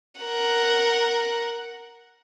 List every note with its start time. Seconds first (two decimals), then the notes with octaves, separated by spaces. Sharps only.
0.21 A#4 F#5